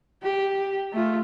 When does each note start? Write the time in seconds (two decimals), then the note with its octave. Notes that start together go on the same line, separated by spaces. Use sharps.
0.23 G4
0.93 A3 F4